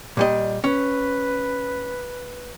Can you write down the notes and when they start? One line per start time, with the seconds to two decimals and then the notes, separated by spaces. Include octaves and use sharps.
0.17 A#2 G3 D#5
0.64 C#4 B4